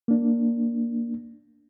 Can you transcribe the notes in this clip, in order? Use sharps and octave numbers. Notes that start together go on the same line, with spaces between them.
A#3 D4